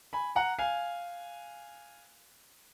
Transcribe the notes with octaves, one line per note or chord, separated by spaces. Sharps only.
G#5 B5
F#5 A#5
F5 G#5